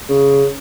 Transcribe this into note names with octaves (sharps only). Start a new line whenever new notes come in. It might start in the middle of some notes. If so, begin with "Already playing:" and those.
C#3